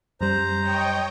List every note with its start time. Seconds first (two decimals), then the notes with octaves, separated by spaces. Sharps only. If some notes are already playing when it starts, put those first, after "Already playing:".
0.21 F#2 G3 C5 A#5
0.61 C#5 D#5 G5